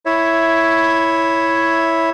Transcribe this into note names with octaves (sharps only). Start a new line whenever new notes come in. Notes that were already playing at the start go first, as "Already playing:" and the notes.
E4 C#5 E5